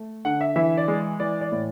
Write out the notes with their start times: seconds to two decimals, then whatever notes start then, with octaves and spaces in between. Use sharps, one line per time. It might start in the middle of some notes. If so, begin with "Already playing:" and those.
Already playing: A3
0.25 D3 F#5
0.41 E5
0.56 E3 E5
0.77 D5
0.88 G#3
1.20 E3 D5
1.41 D5
1.52 A2